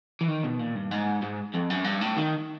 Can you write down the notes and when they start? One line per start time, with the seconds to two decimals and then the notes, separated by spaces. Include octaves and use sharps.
0.21 E3
0.28 D#3
0.44 B2
0.59 A#2
0.76 G2
0.91 G#2
1.22 G#2
1.54 F2
1.70 F#2
1.84 G2
2.01 A2
2.17 D#3